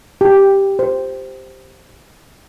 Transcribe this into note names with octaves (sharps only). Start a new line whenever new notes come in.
G4
C5